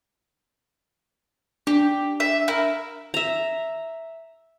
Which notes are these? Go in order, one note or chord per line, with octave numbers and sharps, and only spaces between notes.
D4 G4
E5
E4 A#4
E5 A#5